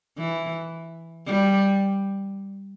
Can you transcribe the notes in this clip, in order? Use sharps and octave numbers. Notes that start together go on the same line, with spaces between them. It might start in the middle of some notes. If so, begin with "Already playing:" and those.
E3
G3